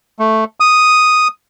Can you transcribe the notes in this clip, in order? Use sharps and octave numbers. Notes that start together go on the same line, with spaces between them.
A3
D#6